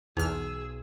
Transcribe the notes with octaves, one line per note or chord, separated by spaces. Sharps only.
B1 E2 D#4 G#4 E6 F6